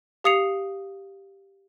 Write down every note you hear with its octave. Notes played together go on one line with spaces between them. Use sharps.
G4 F5 D#6 C7 C#7 F7